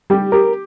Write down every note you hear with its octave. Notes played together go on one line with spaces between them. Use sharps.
G3 G4
G4 A#4